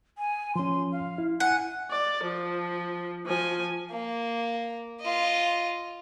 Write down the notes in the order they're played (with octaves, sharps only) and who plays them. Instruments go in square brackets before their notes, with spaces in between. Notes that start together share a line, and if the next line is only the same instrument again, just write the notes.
[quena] G#5
[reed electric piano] F3 C#4 [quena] C6
[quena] F5
[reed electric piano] E4
[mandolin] F#5 [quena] G#5
[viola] D5
F3
F3 G#5
[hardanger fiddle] A#3
F4 D#5